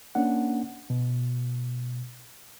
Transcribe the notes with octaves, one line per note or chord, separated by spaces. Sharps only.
A#3 C#4 D4 F#5
B2